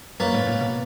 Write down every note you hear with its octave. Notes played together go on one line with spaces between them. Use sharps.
F#2 A#3 C#4 F4 B4
G#2
A#2
B2